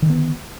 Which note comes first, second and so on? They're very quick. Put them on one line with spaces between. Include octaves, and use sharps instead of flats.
D#3 D3 B3